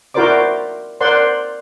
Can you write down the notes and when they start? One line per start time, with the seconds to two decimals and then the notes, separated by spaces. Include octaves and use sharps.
0.14 E4 F#4 A#4 C5 D5 D6
1.01 A#4 C5 D5 F#5 C6